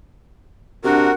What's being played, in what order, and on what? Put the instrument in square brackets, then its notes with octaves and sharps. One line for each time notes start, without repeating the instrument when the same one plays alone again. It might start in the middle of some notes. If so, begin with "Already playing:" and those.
[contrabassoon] C3 [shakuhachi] D4 [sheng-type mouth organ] F#4 A#4 [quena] F#5